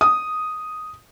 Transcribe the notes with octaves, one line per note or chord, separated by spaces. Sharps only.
D#6